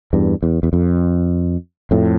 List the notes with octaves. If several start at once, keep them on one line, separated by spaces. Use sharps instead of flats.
E2 G2
E2
E2
F2
F2 A2